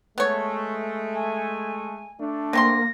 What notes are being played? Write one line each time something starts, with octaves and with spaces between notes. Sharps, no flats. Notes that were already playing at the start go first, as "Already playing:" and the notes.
G#3 A3 B3 C#5
G#5
A3 D4
D3 A#3 C4 C6 A#6